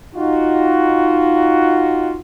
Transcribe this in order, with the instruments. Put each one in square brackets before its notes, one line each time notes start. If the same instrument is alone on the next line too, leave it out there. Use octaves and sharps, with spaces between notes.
[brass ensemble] D#4 F4 F#4